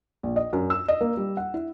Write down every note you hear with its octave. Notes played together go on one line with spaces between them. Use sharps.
A#1
D#5
F#2
E6
D#5
A#3
G3
F#5
E4